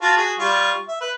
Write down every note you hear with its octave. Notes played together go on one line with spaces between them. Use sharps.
F4 F#4 A5
F#4 G#4
G3 F4 C#6
E5
B4